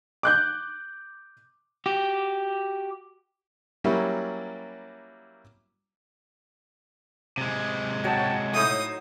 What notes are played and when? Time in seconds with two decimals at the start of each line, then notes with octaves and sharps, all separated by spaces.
0.23 D6 F#6 G6
1.86 F#4 G4
3.84 F#3 G3 A#3 C#4 E4
7.38 C3 G#3
8.04 F#3 C#5 F#5 G5 A5
8.54 A2 D#4 C5 E5 C#6 D#6